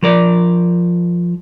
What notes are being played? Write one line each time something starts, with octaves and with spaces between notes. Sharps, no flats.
F3 A#4 D5